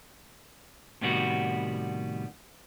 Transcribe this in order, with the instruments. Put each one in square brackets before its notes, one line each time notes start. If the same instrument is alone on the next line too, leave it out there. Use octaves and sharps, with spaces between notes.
[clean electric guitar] A2 C3 D#3 G3 B3 F#4